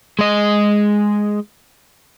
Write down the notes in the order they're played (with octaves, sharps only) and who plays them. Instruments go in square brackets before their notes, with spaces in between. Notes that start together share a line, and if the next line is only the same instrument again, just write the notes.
[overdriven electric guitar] G#3 D#5